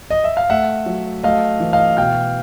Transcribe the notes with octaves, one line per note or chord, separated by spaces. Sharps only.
D#5
E5
F5
A3 E5 F#5
F#3
A3 D#5 F5
E3
D#5 F5
B2 F5 G5